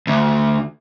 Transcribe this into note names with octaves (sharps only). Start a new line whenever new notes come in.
D2